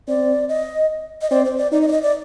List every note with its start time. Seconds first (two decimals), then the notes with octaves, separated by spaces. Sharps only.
0.08 C4 D5
0.49 D#5
1.22 D#5
1.30 C4 D5
1.45 C5
1.58 D5
1.72 D#4 D5
1.82 D#5
1.88 D5
1.92 D#5
2.03 D5